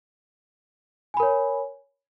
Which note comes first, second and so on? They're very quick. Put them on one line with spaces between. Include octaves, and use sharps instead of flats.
G#5 B5 A#4 C#5